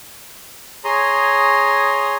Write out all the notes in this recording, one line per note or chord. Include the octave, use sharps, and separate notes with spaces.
G#4 C#5 A#5 C6 D#6